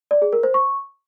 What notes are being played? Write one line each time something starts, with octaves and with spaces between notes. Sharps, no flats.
D5
G#4
A#4
C5
C#6